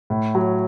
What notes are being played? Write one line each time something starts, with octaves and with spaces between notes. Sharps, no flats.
A2
F#3